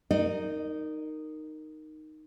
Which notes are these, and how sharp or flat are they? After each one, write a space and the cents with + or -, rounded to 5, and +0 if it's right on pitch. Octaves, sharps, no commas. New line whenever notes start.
D#4 -5 A#4 -10 D5 +45